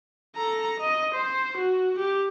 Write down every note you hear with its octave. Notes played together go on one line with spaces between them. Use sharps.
A4 A#5
D#5
C5
F#4
G4